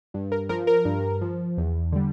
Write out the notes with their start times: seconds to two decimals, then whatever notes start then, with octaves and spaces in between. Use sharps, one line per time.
0.14 G2
0.32 A#4
0.49 F3 A#4
0.67 A#4
0.85 G2
1.22 F3
1.58 E2
1.92 D3 G3